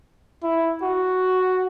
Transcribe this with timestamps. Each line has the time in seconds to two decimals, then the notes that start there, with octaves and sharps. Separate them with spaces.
0.43 E4
0.83 F#4